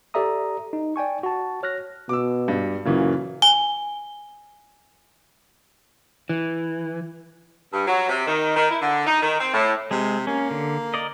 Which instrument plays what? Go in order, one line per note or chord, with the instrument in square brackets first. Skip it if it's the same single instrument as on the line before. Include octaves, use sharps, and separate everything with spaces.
[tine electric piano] G4 A4 D5 E5 A#5 D#6
D#4
D5 G5 G#5 C#6
F#4 A5
C#5 F6 F#6 A#6
[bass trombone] B2 [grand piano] D6 E6
[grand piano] G2
[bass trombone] F#2 [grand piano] A#2 C#3 E3
[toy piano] G#5 [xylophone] G7
[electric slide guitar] E3
[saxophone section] G2
F#3
C3
D#3
D#3
E4
D3
D#4
D#3
C4
A2
[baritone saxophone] C3 [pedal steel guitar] G#3
[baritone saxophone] A#3 [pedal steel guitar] C#4
[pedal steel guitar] D3
A#4 D5 D#5